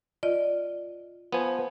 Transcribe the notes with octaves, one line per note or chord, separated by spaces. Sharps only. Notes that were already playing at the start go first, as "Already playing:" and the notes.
F4 D5 D#5
F3 B3 G#5